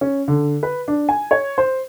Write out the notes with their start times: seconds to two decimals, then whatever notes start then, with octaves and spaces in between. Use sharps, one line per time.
0.01 C#4
0.28 D3
0.63 B4
0.88 D4
1.09 G#5
1.31 C#5
1.58 C5